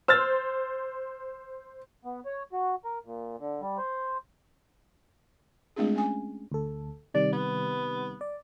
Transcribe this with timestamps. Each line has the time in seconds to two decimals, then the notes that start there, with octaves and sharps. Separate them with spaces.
0.08 C5 E6 F6 A6
2.05 B3
2.26 C#5
2.52 F#4
2.85 A#4
3.05 A#2
3.39 D3
3.61 G3
3.78 C5
5.76 G#3 A3 C4 D4 F4 G#4
5.94 A3 C#4 G#5
6.52 D2 A4
7.14 C3 D#3 G3 D5
7.32 B3
8.21 D5